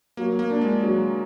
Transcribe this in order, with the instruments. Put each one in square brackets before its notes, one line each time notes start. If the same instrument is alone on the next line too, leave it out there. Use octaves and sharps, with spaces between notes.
[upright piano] F#3 [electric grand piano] A#3
[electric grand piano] A#3
[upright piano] D4
[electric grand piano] G#3
[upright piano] F#3